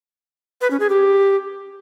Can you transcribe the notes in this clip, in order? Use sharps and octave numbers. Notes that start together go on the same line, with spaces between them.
B4
C#4
G#4
G4